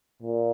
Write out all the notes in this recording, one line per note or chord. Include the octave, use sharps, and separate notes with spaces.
A#2